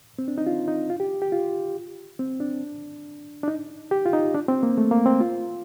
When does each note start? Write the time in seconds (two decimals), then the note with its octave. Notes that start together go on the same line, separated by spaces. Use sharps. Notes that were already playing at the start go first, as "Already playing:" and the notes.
0.19 C4
0.28 D4
0.38 D#4
0.47 F4
0.68 D#4
0.90 F4
1.00 G4
1.22 G4
1.32 F4
2.19 C4
2.40 D4
3.43 D4
3.48 D#4
3.91 G4
4.06 F4
4.13 D#4
4.34 D4
4.48 C4
4.63 A#3
4.78 A3
4.91 A#3
5.06 C4
5.20 F4